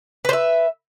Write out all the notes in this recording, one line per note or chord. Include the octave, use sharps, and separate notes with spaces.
B4 C5 E5